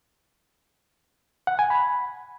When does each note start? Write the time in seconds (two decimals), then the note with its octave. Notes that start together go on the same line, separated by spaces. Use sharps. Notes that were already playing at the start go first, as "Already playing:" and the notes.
1.47 F#5
1.59 G#5
1.70 B5